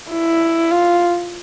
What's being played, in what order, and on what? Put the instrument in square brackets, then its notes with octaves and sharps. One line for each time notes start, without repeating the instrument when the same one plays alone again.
[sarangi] E4
F4